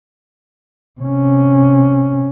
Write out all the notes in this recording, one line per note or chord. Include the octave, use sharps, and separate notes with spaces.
C3 C#4